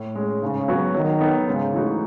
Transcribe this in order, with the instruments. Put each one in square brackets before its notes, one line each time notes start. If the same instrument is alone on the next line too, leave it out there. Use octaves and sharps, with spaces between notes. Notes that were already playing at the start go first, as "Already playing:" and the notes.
Already playing: [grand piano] A2
G#3 C#4
[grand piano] G#2 [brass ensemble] C#3
[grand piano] F#3 B3 F#4 C#5
[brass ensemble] D#3 [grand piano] F#3
[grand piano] B3 D#4 A4
[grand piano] G#2 [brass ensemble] C#3
[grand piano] E3 A3 D#4 F#4